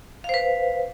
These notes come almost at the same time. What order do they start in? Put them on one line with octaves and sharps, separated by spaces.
F5 C5 B4